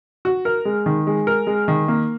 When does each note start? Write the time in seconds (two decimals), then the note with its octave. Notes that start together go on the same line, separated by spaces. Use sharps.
0.25 F#4
0.45 A#4
0.65 G#3
0.86 D#3
1.07 G#3
1.27 A#4
1.47 G#3
1.68 D#3
1.88 A#3